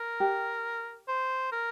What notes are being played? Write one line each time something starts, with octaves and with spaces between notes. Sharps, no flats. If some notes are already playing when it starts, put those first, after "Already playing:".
Already playing: A#4
G4
C5
A#4